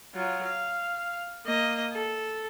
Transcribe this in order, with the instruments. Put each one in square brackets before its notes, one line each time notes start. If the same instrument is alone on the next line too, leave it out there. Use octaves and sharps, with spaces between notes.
[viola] F#3 F4
F5
A#3 D#5
A4